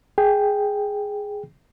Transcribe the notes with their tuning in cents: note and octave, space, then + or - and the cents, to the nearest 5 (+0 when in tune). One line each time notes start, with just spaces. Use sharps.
G#4 +0 G5 +0